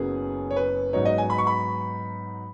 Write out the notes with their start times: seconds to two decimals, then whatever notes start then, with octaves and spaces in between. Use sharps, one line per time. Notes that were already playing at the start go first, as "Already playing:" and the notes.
Already playing: F#1 F#2 F#3 B3 G#4
0.50 C#5
0.56 B4
0.93 G#2 F#3 B3 D#4 C#5
1.05 D#5
1.18 G#5
1.30 B5
1.38 C#6
1.47 B5